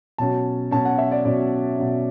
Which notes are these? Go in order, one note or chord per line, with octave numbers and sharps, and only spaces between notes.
B2 F#3 C#4 A5
B2 F#3 C#4 A5
F#5
E5
D5
B2 F#3 C#4 D5
B2 F#3 C#4